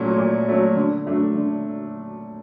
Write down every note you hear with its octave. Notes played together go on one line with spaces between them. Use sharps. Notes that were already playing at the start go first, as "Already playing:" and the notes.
Already playing: A#2 F#3 A3 C#4
A#2
F#3 A3 C#4
D3
F#3 A3 D4
D3